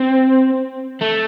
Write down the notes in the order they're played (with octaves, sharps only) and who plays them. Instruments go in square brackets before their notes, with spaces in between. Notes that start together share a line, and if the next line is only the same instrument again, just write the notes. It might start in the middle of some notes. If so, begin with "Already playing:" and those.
Already playing: [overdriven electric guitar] C4
A3